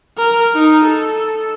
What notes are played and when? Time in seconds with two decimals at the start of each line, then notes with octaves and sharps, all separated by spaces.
0.18 A#4
0.55 D#4
0.85 A4